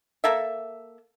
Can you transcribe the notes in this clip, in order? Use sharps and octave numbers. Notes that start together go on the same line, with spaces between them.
A#3 A4 E5